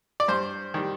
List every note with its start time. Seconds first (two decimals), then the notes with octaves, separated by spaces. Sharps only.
0.20 D5
0.28 G2 C5
0.74 D#3 G3